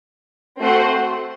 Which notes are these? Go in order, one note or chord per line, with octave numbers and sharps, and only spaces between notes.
A3 C4 F#4 C5 F#5